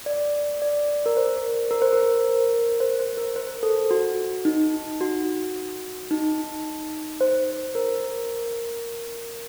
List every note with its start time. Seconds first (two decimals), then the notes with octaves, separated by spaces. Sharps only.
0.06 D5
0.62 D5
1.06 A#4
1.17 C5
1.71 A#4
1.82 C5
1.93 A#4
2.80 C5
2.99 C5
3.17 A#4
3.36 C5
3.63 A4
3.91 F#4
4.45 D#4
5.01 F#4
6.11 D#4
7.21 C5
7.75 A#4